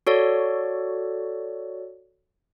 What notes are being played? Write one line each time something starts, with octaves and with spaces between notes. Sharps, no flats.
F#4 A4 C#5 D5